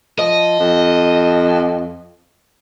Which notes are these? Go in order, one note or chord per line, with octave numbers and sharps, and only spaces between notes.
F3 D#5
F2